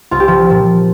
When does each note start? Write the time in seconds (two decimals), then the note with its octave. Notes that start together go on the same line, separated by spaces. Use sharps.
0.11 C2 F4
0.20 G4
0.27 F3 F4
0.50 A#2 F3